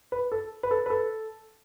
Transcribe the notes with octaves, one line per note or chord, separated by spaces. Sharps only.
B4
A4
B4
A4
B4
A4